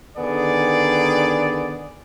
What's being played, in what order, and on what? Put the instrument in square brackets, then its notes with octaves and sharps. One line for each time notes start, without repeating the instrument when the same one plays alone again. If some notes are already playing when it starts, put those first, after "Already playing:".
[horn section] D3 D#3 B3 G#4 D5